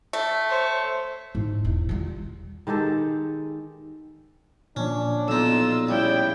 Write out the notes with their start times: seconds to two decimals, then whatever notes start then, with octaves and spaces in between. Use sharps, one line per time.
0.13 A3
0.49 C5 C#5
1.35 G#2
1.65 E1
1.89 G3 F4
2.67 D#3 G#3 G4 A4
4.76 A#2 F3 C#4 D4
5.28 B1 D#4 F4 E6
5.89 C#3 G3 E4 G5